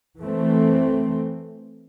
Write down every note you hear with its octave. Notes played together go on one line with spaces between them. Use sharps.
E3 A3 C4